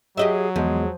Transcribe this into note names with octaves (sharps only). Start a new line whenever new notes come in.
F#3 G4 G#4 D#5 E5
E2 F3 G#3 G#4